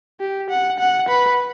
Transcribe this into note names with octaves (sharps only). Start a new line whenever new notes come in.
G4
F#5
F#5
B4